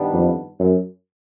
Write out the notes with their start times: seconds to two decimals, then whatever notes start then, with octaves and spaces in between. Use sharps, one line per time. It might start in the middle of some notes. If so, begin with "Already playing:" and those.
Already playing: G2 D#3 G3 B3 D4
0.13 F2
0.59 F#2